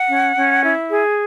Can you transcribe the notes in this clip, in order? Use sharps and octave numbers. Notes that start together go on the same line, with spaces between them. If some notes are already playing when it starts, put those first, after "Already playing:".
Already playing: F#5
C#4
C#4
E4
G#4